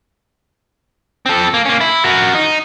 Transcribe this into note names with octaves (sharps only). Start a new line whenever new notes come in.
C4 A4
A#3
A#3 C#4
E4
F#4 A#4
D#4